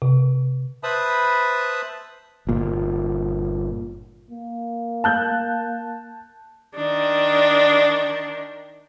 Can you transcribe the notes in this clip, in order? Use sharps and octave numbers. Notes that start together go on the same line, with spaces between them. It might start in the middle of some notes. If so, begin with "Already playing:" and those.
C3
B4 C5 E5 A5 B5 D#6
G1 A#2
A#3
A5 F#6 G6
D#3 D4